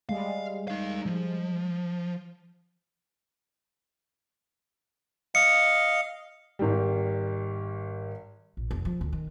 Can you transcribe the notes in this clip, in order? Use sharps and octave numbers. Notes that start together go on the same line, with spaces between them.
G3 G#3 F5
D#4 F5
F3
D#5 F5 C#7
G#1 G3
A#1
F1
F3
D2
D#3